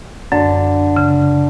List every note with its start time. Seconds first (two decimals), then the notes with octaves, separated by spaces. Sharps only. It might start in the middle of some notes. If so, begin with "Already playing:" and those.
0.32 F#2 D3
0.96 C#3